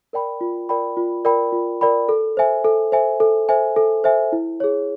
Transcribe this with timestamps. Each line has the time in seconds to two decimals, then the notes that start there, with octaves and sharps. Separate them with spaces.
0.13 A#4 D5 G5 B5
0.41 F4
0.69 A#4 D5 G5 B5
0.97 F4
1.25 A#4 D5 G5 B5
1.52 F4
1.81 A#4 D5 G5 B5
2.09 A4
2.37 C5 E5 G#5
2.65 A4
2.92 C5 E5 G#5
3.20 A4
3.49 C5 E5 G#5
3.76 A4
4.04 C5 E5 G#5
4.32 E4
4.60 G#4 C#5